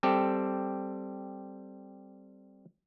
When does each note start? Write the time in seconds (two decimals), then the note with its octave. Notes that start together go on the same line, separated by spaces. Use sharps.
0.03 G3 C4 G4 A4